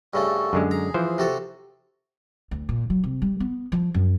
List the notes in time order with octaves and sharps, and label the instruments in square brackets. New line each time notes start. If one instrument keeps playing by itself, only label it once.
[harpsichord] G2 C#3 A3 [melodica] F#4 A4
[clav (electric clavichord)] F#2 D3 G#3
[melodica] G#4 [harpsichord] A#5
[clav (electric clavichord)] E3 F3 C5
[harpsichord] C3 F#4 A4
[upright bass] D2
A#2
F#3
C3
G3
B3
F3
F#2